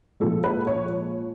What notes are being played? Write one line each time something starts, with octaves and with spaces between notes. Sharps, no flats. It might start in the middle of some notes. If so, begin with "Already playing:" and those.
A#2 F3 G#3 A4
B4
C#5